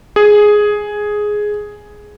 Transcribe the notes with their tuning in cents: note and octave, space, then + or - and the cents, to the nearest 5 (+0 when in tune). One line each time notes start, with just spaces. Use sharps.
G#4 +5